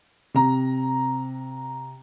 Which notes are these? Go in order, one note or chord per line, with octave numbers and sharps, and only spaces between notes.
C3 A#5